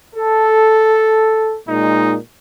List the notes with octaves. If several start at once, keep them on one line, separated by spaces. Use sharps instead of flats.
A4
A#2 G#3 D#4